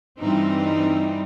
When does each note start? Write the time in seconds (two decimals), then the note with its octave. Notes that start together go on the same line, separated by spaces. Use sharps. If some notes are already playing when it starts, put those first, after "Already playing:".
0.20 G2 E3 G3 C4 D#4